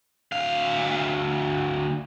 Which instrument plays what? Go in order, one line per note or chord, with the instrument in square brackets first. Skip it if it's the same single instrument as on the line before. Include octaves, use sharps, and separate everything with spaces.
[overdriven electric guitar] D2 F5